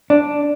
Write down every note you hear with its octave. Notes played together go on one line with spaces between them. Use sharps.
D4